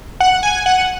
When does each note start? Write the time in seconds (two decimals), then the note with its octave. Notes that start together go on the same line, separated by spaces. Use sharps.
0.20 F#5
0.43 G#5
0.66 F#5